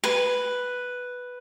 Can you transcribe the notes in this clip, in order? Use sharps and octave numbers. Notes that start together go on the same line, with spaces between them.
B4